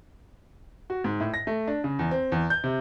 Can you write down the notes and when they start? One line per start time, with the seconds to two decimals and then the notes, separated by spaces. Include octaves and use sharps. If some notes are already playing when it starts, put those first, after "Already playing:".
0.90 F#4
1.04 G#2
1.20 A2
1.34 A#6
1.47 A3
1.68 D4
1.84 C#3
1.99 E2
2.11 C4
2.32 E2
2.50 G6
2.64 C3